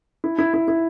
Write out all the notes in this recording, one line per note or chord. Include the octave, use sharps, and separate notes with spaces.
E4
E4
E4
E4